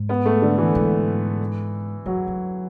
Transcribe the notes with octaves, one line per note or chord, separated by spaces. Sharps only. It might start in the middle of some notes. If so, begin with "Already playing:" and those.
Already playing: G#2
B3
A3
D3
E3
G#2
F#2 F#3
F#2